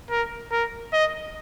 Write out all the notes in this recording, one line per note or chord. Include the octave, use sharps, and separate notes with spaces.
A#4
A#4
D#5